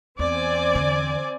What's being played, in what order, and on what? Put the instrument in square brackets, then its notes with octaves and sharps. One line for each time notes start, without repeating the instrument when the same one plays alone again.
[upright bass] E2 [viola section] C4 D5 G#5
[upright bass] E2 D3